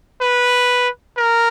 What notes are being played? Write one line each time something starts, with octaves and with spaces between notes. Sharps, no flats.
B4
A#4